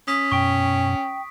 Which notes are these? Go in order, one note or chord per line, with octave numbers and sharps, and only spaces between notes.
C#4 D#6 B6
F#2 B2 G5 C#6 D7